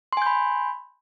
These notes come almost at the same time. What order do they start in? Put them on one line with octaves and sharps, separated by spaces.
C6 G#5 G6 B5